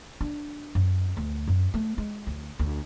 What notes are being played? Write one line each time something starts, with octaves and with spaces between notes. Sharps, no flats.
D4
F#2
D2
F#2
A3
G#3
D2
D2